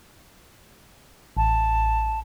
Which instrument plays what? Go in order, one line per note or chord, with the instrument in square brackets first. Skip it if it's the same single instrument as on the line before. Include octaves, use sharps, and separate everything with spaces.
[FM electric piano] A1 [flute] A5